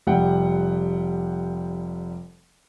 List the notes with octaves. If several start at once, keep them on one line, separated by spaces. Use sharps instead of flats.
F1 G3 F#5 G5